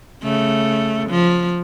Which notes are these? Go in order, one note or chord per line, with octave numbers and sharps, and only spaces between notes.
C#3 A3
F3